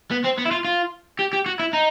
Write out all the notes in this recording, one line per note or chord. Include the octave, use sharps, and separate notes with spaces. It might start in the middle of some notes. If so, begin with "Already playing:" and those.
B3
C4
B3
E4
F4
F4
G4
G4
F#4
E4
D#4